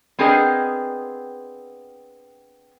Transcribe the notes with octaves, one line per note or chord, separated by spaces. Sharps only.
B3 C4 D4 G#4 A#4 D#5